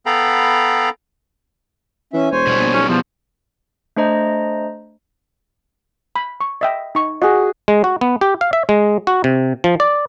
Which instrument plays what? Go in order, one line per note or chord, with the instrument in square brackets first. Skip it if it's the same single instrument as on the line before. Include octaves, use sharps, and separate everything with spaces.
[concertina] B3 A4 F5 G5 A#5 B5
[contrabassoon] E3 [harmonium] C#4 E5
[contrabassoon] E1 [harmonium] C5 C#5 G#5
[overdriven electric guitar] B2 G3
[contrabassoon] A#1
[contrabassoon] B1 [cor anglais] C#4
[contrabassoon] E2 [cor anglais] F3
[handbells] A3 D4 C5 D#5 A#5
[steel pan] B5
C#6
D#5 E5 G5
D#4 C#6
[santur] F#4 G#4 [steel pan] D#5
[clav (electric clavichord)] G#3
F#4
B3
G4
F5
E5
G#3
F#4
C3
F3
D5